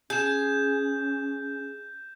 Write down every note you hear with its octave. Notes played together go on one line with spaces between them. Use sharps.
C#4 G#4 G6 E7